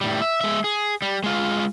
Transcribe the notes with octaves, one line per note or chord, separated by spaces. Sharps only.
A2 G3
E5
G#3 E5
G#4
G3
G#3 F4